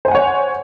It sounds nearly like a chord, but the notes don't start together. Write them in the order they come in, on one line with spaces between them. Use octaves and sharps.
C5 G#5 F#5 C#5